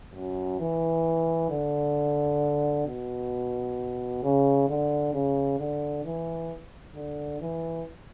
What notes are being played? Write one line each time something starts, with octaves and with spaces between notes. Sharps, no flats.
F#2
E3
D3
B2
C#3
D3
C#3
D3
E3
D3
E3